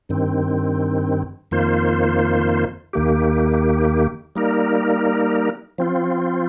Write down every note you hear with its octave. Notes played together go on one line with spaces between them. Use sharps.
G2 D#3 C4
F2 D#3 A#3 F4 C5
D#2 D#3 A#3 G4
G3 A#3 D#4 A#4
F3 C4 F4